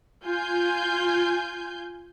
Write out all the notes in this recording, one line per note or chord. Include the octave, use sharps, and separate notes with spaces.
F4 G#5 G6